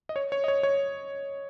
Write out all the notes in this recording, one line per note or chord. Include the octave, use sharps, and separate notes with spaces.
D#5
C#5
C#5
D#5
C#5
C#5